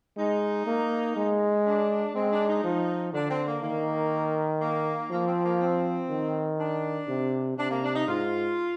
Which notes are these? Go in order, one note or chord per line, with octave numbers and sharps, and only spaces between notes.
G#3 D#4
A#3
G#3
D4
G#3 C4
D4
D#4
F3
D3 D4
C4
A#3
D#3 A#3
A#3
F3 A#3
C4
A#3
C4
D#3
D4
C3
C3 D4
A#3
D4
D#4
G#2 F4